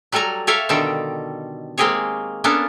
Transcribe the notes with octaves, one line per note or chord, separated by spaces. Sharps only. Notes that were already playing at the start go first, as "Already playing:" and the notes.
F#3 G3 A4 G#5 A#5
G4 A4 C#5 E5 F5
B2 D3 D#3 G3 G4 A4
G#3 A#3 C4 G4 G#4 C#5
A#3 B3 C#4 D4 A4